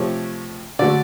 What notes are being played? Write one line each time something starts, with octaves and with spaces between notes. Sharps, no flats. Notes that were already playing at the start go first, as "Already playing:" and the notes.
Already playing: C3 F3 A3 C#5
D3 F#3 A3 D5